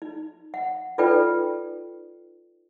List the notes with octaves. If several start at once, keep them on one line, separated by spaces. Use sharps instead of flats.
D#4
F#5
D#4 F4 A4 B4 D5 G5